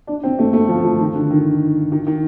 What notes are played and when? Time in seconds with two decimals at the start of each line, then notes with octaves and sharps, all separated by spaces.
0.07 D4
0.23 C4
0.39 A3
0.53 A3
0.69 F3
0.85 F3
0.99 D#3
1.15 D3
1.30 D#3
1.92 D#3
2.07 D#3